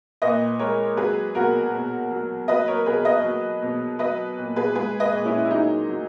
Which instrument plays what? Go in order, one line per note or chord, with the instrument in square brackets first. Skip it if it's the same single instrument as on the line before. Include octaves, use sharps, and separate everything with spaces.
[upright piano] A#2 B4 D#5
G#3 A#4 C#5
F#3 G#4 B4
B2 F#4 A#4
B2
F#3
F#3 B4 D#5
A#4 C#5
B2 G#4 B4
B4 D#5
F#3
B2
F#3 B4 D#5
A#2
G#4 B4
G#3 G#4 B4
B4 D#5
A#2
C#4 E4
E4
F#3 D#4
F#3